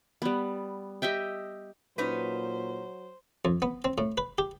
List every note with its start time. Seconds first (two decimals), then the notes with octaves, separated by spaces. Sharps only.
0.22 G3 B3
1.02 G4 D#5 E5 G5
1.98 A#2 F#3 C#4 D#4 B4 C5
3.45 F2
3.62 B3
3.85 C4
3.98 A2
4.18 B4
4.38 G4